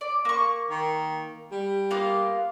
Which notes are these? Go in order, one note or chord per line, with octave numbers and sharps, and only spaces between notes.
D5
A#3 C#6
D#3
G3
A#3 B3 F4